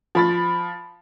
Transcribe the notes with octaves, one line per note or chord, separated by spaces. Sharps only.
F3 B5 A6